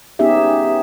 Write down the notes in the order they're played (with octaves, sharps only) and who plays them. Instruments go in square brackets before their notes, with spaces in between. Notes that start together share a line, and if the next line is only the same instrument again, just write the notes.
[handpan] B3 C#4 D#4 G4 G#4 E5